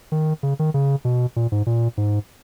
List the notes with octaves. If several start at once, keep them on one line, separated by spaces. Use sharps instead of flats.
D#3
C#3
D#3
C#3
B2
A#2
G#2
A#2
G#2